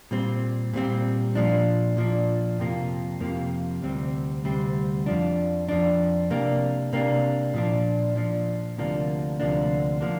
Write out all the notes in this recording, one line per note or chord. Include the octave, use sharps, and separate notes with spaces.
A#2 G3 C4
A#2 G3 C4
A#2 F3 D4
A#2 F3 D4
F2 C3 F3 A#3
F2 C3 F3 A#3
D2 C3 G3 C4
D2 C3 G3 C4
F2 F3 D4
F2 F3 D4
C3 A#3 D4
C3 A#3 D4
A#2 F3 D4
A#2 F3 D4
D2 C3 F3 A#3 D4
D2 C3 F3 A#3 D4
F3 A#3 D4